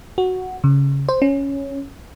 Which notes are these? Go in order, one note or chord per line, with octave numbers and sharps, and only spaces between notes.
F#4
C#3
C5
C#4